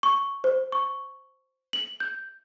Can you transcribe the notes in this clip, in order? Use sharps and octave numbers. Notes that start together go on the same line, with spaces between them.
C#6
C5
C#6
F#7
G6